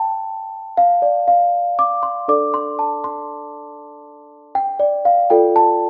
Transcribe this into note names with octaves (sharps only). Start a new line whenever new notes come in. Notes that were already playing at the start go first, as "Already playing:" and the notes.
Already playing: G5 A5
F5
D5
F5
D6
C6
D4 A4 D5 D6
C6
A5
C6
G5
D5
F5
F4 A4 D5 G5
A5